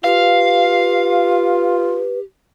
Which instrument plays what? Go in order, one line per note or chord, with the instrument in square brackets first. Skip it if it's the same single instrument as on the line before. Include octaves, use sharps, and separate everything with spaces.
[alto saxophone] F4 [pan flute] G4 [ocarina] B4 [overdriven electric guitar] F5